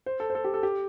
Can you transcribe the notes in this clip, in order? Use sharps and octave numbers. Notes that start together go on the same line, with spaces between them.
C5
A4
C5
A4
G4
A4
G4